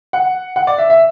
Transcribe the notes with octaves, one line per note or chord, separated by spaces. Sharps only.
F#5
F#5
D5
E5
E5